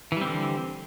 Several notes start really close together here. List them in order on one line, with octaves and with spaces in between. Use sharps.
E3 G3 C4 D3